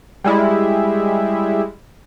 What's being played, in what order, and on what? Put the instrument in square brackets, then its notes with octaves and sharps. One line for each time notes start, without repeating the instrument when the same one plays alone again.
[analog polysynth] G3 G#3 E4